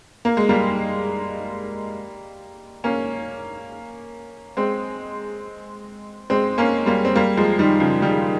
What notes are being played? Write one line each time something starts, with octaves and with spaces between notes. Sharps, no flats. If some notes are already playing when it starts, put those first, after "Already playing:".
A#3
G#3
G3 A#3
A#3 C#4
G#3 C4
G#3 C4
A#3 C#4
G3 A#3
C4
G3 A#3
F3 G#3
D#3 G3
C#3 F3
D#3 G3